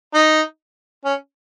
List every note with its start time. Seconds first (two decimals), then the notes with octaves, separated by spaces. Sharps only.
0.14 D#4
1.05 C#4